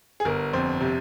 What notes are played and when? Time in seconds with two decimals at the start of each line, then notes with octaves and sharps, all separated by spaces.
0.20 G#4
0.25 G1 A#4
0.53 F2 C5
0.81 C3